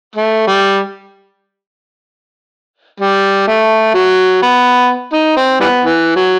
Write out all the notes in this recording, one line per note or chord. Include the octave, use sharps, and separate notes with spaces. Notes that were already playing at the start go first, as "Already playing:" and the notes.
A3
G3
G3
A3
F#3
B3
D#4
C4
E3 G3 B3
E3
F#3